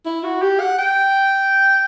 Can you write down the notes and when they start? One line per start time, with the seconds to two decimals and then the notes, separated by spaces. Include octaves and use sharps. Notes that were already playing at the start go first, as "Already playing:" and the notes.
0.06 E4
0.24 F#4
0.42 G4
0.60 F#5
0.79 G5